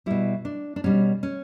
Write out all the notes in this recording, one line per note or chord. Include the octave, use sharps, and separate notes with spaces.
B2 G3 E4
D4
D4
B2 G3 C#4
C#4